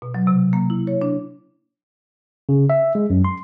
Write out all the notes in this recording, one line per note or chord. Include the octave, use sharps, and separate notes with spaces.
B2
F#3
C3
A#3
E4
C#5
D4
C#3
E5
G#3
F#2
C6